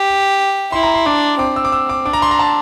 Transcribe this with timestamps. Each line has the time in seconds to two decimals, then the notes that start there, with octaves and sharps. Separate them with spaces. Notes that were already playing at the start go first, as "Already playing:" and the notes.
Already playing: G4
0.72 E4 C6
0.83 A#5
0.94 C6
1.06 D4 D6
1.39 C4 D6
1.56 E6
1.65 D6
1.72 E6
1.89 D6
2.06 D4 D6
2.13 A#5
2.22 C6
2.31 A#5
2.39 A5